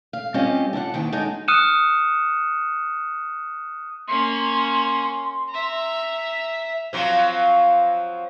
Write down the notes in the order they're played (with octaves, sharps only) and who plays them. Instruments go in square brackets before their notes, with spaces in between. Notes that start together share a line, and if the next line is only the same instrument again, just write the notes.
[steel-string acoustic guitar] F5
G3 C4 C#4 F4 G4 D#5
D4 E4 F4 F#5
D#2 G#2 D#3 E3 G5
G#3 D4 D#4 F#4
[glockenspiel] D#6 F6 F#6 C#7 D#7 E7
[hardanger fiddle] A#3 C#4 [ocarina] C6
[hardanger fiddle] E5 A#5
[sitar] F3 F#3 C4